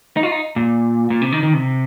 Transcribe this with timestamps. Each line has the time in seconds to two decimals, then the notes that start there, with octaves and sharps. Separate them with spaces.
0.17 D#4
0.23 F4
0.32 D#4
0.56 A#2
1.10 A#2
1.22 C3
1.32 D#3
1.43 D#3
1.54 C3